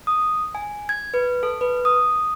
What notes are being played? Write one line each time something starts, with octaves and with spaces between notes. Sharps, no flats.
D#6
G#5
G#6
B4
A4
B4
D#6